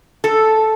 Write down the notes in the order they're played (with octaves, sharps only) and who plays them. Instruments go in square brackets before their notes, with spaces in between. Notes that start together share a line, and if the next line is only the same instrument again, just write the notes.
[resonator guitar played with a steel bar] A4